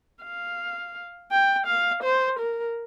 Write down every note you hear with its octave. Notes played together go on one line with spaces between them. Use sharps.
F5
G5
F5
C5
A#4